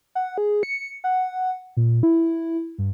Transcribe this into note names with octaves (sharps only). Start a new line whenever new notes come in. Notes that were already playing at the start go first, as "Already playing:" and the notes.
F#5
G#4
C#7
F#5
A#2
E4
G2